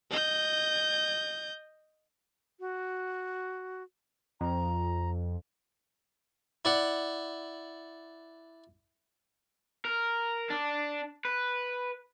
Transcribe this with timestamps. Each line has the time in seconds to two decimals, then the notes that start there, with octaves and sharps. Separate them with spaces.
0.11 D#5 G6
2.60 F#4
4.41 F2 A#5
6.65 E4 D5 F#5
9.85 A#4
10.50 D4
11.25 B4